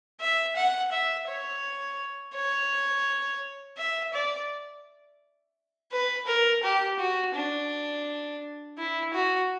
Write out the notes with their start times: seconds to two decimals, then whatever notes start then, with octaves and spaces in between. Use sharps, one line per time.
0.21 E5
0.56 F#5
0.92 E5
1.28 C#5
2.35 C#5
3.78 E5
4.13 D5
5.92 B4
6.27 A#4
6.63 G4
6.99 F#4
7.35 D4
8.77 E4
9.13 F#4